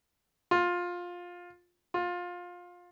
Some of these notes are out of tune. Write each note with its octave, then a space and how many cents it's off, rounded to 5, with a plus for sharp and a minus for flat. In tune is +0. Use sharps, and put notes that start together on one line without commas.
F4 +15
F4 +20